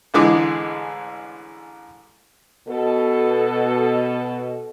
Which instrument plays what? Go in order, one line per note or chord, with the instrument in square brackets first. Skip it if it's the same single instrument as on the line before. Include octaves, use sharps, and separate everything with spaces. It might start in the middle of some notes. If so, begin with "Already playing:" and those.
[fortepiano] A1 D3 E3 G#3 D6
[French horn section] B2 A4